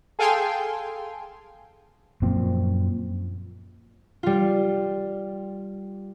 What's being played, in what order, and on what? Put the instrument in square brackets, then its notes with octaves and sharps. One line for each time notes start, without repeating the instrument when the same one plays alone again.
[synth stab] G#4 A4 F5 G5 G#5 C6
[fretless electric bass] F#2 A#2 F3 C4
[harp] G3 F4